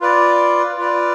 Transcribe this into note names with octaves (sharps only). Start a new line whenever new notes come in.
F4 B4 D5
F4 B4 D5